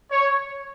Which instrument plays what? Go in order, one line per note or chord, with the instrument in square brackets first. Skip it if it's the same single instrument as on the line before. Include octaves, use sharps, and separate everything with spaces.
[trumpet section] C#5